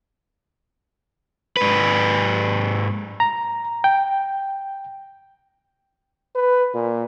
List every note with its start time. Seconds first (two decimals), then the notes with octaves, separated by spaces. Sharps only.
1.57 G#2 B4
3.20 A#5
3.84 G5
6.35 B4
6.74 A#2